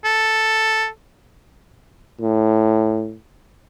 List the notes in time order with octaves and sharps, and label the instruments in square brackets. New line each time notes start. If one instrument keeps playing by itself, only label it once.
[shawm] A4
[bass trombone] A2